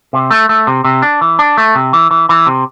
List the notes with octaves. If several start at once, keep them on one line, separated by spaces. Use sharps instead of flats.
C3
A3
A3
C3
C3
D4
E3
D4
A3
C3
E3
E3
E3
C3